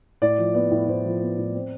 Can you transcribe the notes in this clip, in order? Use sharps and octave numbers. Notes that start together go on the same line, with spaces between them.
A2 D5
F3
B3 D5
A2
A2 C5
F3
B3
A2
C4